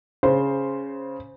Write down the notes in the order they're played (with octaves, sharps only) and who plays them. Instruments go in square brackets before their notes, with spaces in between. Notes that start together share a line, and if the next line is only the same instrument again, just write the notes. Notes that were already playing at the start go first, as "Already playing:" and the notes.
[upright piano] C#3 [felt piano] C5